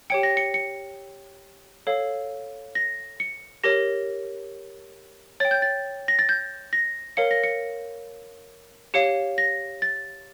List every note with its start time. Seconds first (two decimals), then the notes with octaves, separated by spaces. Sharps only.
0.10 G4 C#5 G5 C#7
0.23 A#6
0.37 C#7
0.54 C#7
1.87 A4 C#5 F5
2.75 A#6
3.20 C#7
3.63 G4 A#4 C#5 A#6
5.40 C#5 G5 A6
5.51 G6
5.62 A6
6.08 A#6
6.19 A6
6.29 G6
6.73 A#6
7.17 A#4 C#5 F5 C#7
7.31 A#6
7.44 C#7
8.94 G4 C#5 F5 C#7
9.38 A#6
9.82 A6